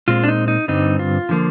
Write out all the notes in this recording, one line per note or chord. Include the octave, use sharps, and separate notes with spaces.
A#2 G#3 C4 F4
D4
D#4
D#4
G2 D3 G3 C4 D#4
F4
D3 F3 A#3